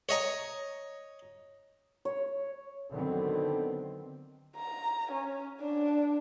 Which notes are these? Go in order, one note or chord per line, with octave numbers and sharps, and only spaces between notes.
C#5 D#5 A#5
C#5
D3 D#3 F#3 B3 C4
A#5
C#4
D4